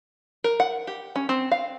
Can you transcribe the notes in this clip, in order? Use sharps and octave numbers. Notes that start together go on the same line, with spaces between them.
A#4
F#5
G4
C#4
C4
F5